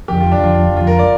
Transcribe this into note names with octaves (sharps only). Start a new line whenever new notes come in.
F2 D3 F3 G4
F4
D4
F2 D3 F3 F4
F2 D3 F3 F4
A#4
D5